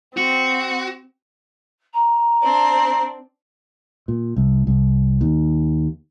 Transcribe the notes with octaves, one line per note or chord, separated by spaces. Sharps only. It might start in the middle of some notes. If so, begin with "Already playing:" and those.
C4 F#4
A#5
C4 D4
A#2
C2
C2
D#2